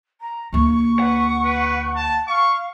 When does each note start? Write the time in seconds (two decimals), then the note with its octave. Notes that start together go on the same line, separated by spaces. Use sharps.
0.21 A#5
0.53 D2 A#3 C#6
0.99 B4 F#5
1.44 B4
1.95 A5
2.28 F5 C#6